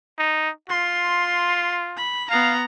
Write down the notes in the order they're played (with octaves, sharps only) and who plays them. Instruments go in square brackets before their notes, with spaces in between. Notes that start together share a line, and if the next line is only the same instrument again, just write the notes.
[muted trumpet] D#4
[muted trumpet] F4 [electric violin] C6
[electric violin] B5
[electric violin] B3 A#5 [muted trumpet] F5